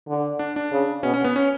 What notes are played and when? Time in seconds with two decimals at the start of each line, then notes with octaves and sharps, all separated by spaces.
0.08 D3
0.39 D4
0.56 D4
0.71 C#3
1.03 B2 C#4
1.14 C#4
1.24 B3
1.36 C#4